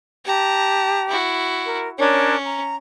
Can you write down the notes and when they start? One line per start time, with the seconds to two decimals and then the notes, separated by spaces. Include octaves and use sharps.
0.25 G4 A5 A#5
1.09 E4 F#4
1.66 A#4
1.98 C#4 D4 A#4 C#5
2.44 A#5